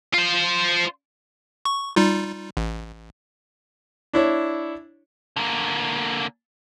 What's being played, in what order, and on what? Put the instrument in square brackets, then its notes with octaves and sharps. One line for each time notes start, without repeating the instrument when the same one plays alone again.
[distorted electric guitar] F4 C5
[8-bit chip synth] C#6
G3 D#4 F4
A1
[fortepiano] D4 E4 C#5
[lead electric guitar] D3 A#3